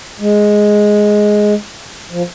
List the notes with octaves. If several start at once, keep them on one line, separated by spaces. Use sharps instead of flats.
G#3
F3